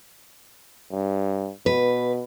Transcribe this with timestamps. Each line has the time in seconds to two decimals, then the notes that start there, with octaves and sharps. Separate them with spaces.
0.92 G2
1.66 B2 B4